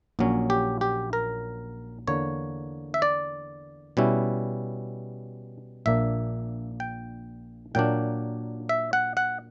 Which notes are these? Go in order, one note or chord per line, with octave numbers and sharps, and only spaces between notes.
A#1 A#2 F#3 C#4
G4
G4
A#4
E2 D3 A#3 C#5
E5
D5
B2 G3 C#4 E4
A#1 A#2 A#3 D4 E5
G5
A#2 F#3 A#3 D4 G5
E5
F#5
F#5